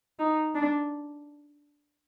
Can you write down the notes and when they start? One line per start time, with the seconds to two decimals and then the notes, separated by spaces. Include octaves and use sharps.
0.19 D#4
0.55 D4